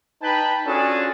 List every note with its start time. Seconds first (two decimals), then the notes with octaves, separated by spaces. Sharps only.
0.22 D#4 B4 G5 A5 B5
0.66 C#4 D4 F4 F#4 G#4 A4